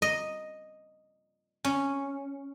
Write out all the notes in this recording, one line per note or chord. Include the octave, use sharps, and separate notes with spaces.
D#5
C#4